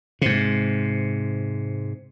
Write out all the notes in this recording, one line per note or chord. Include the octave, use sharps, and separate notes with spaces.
G#2 C3